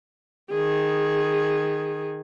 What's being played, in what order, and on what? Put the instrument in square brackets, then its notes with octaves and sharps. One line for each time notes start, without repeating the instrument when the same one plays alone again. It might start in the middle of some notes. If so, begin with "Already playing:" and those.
[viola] D#3 G#4